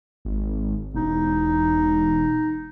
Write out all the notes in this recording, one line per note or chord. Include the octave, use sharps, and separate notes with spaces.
G#1
E1 D#4